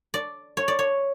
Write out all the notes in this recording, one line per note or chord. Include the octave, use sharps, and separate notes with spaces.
D5
C#5
D5
C#5